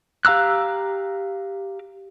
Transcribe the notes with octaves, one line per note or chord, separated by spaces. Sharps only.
G4 F5 A#5 E6 F#6